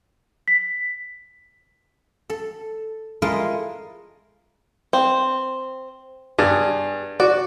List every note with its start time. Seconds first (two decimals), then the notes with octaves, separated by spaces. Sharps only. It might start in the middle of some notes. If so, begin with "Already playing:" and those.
0.48 B6
2.30 A4
3.22 G#3 E4 F4 A4 A#4 D#5
4.93 C4
6.39 G2 G#4
7.20 F#4 D5